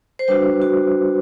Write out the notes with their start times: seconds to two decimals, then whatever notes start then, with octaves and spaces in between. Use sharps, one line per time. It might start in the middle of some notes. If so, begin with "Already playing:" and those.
0.19 C5
0.28 G3 D4 F#4 B4
0.62 F#4